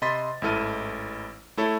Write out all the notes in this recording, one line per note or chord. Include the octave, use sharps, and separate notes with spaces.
C3 D#5 B5 C6 A6 B6
A1 G#2 E4 A4 F6 D#7
A3 E4 A4 C#5